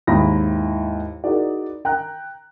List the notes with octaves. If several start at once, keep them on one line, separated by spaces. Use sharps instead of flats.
D#2 G#2 E4 A#5 B5 A#6
D#4 E4 F#4 G#4 A#4 D5
G5 A#5 F#6